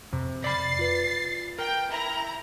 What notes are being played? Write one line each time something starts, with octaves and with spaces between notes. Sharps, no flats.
F2 C3
D5 B5 A6 C7
F4 B4
A#4 G5
E4 A#5